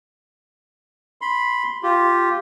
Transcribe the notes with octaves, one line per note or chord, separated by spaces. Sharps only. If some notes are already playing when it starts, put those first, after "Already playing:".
B5 C6
F4 G4